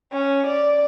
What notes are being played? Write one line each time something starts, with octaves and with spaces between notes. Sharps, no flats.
C#4
D5